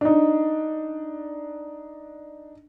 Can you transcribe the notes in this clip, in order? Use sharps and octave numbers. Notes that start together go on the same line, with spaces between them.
D4 D#4